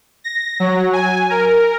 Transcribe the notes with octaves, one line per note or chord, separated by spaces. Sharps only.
A#6
F#3
G#5
A#4